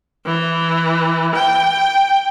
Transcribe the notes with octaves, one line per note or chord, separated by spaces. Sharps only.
E3
G5